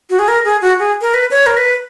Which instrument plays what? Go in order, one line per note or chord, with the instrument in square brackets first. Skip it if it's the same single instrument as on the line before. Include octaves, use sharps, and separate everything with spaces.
[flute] F#4
G#4
A#4
G#4
F#4
G#4
A#4
B4
C#5
A#4
B4